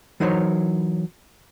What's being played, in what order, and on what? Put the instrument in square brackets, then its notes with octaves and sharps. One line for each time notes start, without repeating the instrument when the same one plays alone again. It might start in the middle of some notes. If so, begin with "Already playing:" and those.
[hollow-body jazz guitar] E3 F#3 D#4 A#4 C5 C#5